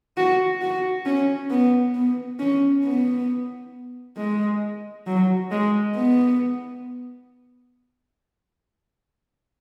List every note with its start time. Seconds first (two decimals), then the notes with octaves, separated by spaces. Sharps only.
0.17 F#4
0.61 F#4
1.06 C#4
1.50 B3
1.95 B3
2.39 C#4
2.84 B3
4.17 G#3
5.07 F#3
5.51 G#3
5.96 B3